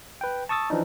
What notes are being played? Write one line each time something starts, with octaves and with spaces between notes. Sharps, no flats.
B4 G5
A5 C#6 D#6 E6 A6
E3 F3 D4 D#4